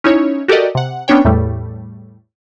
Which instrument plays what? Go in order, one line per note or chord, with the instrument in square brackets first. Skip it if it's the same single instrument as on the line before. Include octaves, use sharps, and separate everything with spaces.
[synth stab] C#4 D#4 E4 C#5
F#4 G4 A4 A#4 D5 D#5
C3 F#5
B3 C#4 D4 C#5 G5
E2 A2 G3 A3